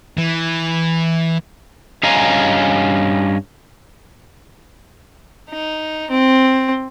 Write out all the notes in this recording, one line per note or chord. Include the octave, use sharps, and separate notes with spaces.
E3
G2 C#4 D#5 F5 G#5 A#5
D#4
C4